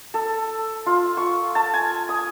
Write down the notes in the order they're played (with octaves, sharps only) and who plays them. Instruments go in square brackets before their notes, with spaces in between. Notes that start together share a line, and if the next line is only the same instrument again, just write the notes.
[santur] A4
F4
C#6
A5
G#5
D#6